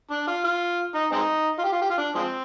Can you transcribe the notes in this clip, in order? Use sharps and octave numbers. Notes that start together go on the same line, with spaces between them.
D4
F4
F4
D#4
G#3 C4 D#4
F4
G4
F4
G4
F4
D4
F3 G#3 C4